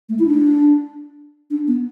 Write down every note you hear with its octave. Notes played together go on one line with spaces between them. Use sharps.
A3
E4
D4
D4
B3